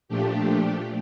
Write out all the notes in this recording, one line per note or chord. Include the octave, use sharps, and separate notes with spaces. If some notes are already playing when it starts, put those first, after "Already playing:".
A#2 F3 A3 D4 G4